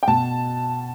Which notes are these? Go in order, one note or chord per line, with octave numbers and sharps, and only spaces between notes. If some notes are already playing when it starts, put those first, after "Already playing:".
G5
B2 A5